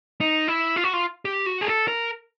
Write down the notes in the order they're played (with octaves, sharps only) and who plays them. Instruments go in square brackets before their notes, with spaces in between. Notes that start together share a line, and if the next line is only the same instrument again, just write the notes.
[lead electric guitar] D#4
E4
F4
F#4
F4
G4
F#4
G#4
A4
A#4